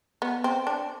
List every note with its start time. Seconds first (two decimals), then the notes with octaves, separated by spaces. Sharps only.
0.22 B3
0.44 C4
0.67 D4